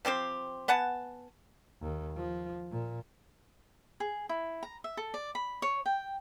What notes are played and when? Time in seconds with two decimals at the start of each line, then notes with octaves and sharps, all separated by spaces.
0.05 F3 C4 G4 C5
0.68 B3 F#5 G#5 A5
1.82 D#2
2.17 F3
2.71 A#2
4.00 G#4
4.29 E4
4.63 A#5
4.84 E5
4.97 A4
5.14 D5
5.35 B5
5.62 C#5
5.86 G5